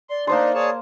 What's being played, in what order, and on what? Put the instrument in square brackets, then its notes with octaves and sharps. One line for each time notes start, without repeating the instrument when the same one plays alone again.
[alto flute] D5 [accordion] C6
[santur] A#3 C5 C6 [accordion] D4 D#4
[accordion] G#4 C#5 A5